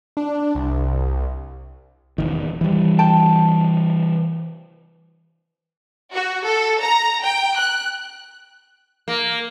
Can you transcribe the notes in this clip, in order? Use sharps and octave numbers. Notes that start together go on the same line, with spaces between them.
D4
C2
E1 C2 D#3
E3 G3
G5 A5
F#4
A4
A#5
G5
F#6
A#3